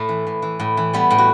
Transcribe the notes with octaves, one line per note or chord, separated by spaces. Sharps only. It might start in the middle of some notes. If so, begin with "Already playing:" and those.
Already playing: A2 A3
E3
A2
E3
A2
E3
G3 B3
A2
F#4